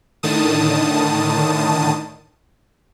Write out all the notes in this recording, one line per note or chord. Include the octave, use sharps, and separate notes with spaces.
A2 D3 D#3 A5 D#6